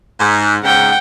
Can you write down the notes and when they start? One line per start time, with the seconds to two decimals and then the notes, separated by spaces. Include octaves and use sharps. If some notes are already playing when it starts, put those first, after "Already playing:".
0.20 G#2
0.64 G#2 C#3 F#5 G5